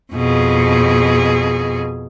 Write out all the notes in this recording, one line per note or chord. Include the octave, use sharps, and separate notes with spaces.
F2 B2 G#4